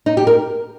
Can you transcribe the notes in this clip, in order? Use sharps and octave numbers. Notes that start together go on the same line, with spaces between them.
D#4
G4
A#4